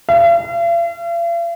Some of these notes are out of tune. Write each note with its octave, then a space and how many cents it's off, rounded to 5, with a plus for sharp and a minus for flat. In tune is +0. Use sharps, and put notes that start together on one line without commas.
F5 -45